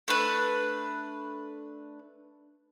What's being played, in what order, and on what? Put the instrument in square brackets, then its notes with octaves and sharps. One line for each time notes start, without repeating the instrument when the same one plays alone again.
[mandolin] A3 D4 B4